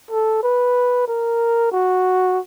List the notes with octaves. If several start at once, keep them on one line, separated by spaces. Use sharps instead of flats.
A4
B4
A#4
F#4